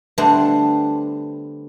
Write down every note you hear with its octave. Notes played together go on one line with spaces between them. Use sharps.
D3 G3 A3 B3 C4